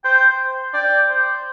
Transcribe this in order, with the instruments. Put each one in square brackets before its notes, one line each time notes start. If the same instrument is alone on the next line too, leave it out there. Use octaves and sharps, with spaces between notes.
[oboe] C5 [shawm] G5
[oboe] D5 [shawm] G5
[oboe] C5